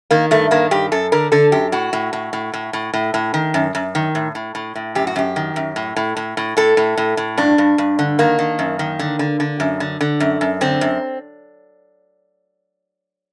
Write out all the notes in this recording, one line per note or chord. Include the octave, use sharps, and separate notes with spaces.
D#3 A#3
G2 A3
D#3 A#3
G2 G4
F#2 A4
D3 A#4
D3 A4
F#2 G4
A2 F#4
A2
A2
A2
A2
A2
A2
A2
D#3
F#2
F#2
D#3
A2
A2
A2
A2
F#2 G4
F#4
F#2 G4
D#3
F#2
A2
A2
A2
A2
A2 A4
A2
A2
A2
G2 D4
G2
G2
D3
D#3 A#3
D#3
F#2
D#3
D3
D3
D3
F#2
D3
D3
F#2
F#2
D3 C4
F#2